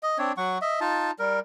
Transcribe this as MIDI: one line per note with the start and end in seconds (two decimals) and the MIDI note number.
0.03 0.18 75
0.18 0.32 60
0.18 0.32 62
0.18 0.32 73
0.37 0.58 54
0.37 0.58 78
0.37 0.58 85
0.61 0.80 75
0.61 0.80 76
0.81 1.11 63
0.81 1.11 65
0.81 1.11 81
1.19 1.40 55
1.19 1.40 70